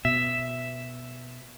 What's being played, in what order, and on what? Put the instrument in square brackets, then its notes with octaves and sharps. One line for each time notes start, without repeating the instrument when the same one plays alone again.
[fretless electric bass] B2 [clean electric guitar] E5